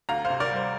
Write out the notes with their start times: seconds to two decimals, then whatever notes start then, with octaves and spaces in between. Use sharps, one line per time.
0.09 D2 F5 A#5
0.25 C5 F5
0.30 C3
0.40 A#4 D5
0.51 G3 C5